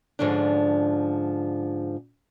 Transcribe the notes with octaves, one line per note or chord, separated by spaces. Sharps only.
G#2 D3 F3 C#4 D4